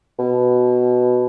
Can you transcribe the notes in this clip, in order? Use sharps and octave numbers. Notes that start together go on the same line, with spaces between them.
B2